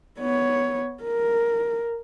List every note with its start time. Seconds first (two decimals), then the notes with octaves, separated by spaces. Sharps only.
0.19 B3 C#5
1.03 A#4